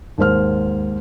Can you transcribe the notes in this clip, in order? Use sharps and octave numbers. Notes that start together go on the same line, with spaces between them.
D#2 G#2 C5 F6